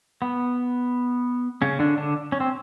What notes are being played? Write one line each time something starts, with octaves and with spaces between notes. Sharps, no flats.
B3
C#3 C#4
D3 D4
D3 D4
C#4
C4